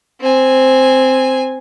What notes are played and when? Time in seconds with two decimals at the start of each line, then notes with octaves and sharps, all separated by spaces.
0.21 C4 G#5